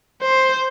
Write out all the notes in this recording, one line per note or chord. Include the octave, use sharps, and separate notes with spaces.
C5